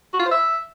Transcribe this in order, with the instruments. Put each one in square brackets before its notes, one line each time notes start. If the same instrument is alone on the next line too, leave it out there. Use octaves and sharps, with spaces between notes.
[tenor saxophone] F#4
F4
C5
E5